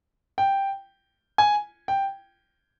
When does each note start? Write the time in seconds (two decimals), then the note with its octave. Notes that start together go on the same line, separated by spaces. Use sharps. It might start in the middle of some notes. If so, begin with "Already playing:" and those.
0.38 G5
1.38 G#5
1.88 G5